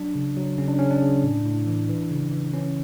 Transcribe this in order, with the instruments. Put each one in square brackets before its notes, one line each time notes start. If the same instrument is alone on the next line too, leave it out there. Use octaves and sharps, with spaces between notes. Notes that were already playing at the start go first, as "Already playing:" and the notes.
Already playing: [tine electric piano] F#3 D4
C#3
F#3
C#3 C#4
D4
C#3 C#4
D4
C#3
A2
A2
E3
E3
C#3
E3
E3 C#4